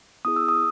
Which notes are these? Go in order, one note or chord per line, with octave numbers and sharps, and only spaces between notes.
B3 E4 G#4 D#6
E6
D#6